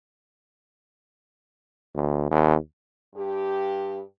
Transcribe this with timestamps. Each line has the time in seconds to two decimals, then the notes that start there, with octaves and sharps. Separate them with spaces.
1.95 D2
2.31 D#2
3.15 G2 G4